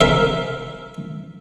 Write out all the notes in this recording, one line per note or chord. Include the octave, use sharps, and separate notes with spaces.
A#4 E5